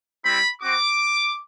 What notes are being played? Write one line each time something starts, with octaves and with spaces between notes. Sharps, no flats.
G3 C4 E4 B5
C4 F#4 D6